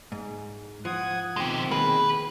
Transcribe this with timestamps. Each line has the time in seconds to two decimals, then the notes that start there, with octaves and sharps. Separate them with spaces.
0.12 G#2
0.85 F3 F#5 D#6 G#6
1.37 B2 D#3 G#3 C4 G4
1.71 A#3 G#4 B4